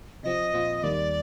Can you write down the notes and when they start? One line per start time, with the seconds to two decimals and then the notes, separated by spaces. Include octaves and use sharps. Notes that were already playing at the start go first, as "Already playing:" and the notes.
0.23 C3 F3 C4 D#5
0.53 A#2 F3 C4 F4
0.83 D#2 D#3 G3 A#3 D5